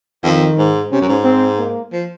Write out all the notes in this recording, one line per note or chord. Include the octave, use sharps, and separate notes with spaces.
F2 D#3
G#2
C3 C#4
F#2
G#2
C4
A#3
F3